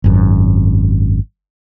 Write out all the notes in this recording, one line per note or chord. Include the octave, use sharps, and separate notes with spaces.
G#1 F#2